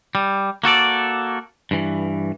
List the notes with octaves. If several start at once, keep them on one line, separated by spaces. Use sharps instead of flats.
G3
A#3 F#4 A4 D5
G2 E3